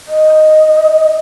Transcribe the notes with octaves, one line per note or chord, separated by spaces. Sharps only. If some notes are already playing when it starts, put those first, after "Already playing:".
D#5